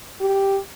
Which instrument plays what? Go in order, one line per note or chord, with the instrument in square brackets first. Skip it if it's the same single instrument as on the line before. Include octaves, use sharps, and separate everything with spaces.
[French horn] G4